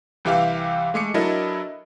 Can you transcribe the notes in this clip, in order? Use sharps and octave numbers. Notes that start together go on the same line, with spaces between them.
C2 E3 G4 E5 F5
G#3 A3 D6 C#7
F#3 D4 E4 A4 A#4 D#5